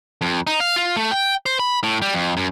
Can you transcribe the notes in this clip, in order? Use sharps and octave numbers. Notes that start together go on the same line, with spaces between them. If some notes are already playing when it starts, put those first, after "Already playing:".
F2
D#4
F5
F4
A3
G5
C5
B5
A2
G3
F2
F#2